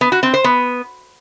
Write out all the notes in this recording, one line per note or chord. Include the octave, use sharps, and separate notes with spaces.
B3
F#4
C4
C5
B3